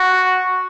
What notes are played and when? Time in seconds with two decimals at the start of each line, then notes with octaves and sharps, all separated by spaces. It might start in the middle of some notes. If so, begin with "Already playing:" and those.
Already playing: F#4